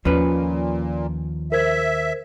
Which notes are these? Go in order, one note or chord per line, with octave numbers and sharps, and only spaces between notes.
D#2 A#2 F3 C#4 B4
A#4 C5 E5 G#6